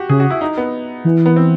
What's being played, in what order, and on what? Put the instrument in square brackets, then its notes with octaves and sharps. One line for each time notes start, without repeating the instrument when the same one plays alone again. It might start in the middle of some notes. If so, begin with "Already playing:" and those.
Already playing: [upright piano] F#4 G4
[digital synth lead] C#3 [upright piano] G#4
[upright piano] F#4
E4
D#4
B3
[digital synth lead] E3
[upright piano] B3
C4